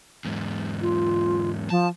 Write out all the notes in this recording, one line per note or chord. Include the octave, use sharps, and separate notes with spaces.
E2 G#2
F4
F3 A5